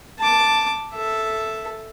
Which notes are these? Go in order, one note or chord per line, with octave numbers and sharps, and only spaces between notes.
A5 D6
A4 E5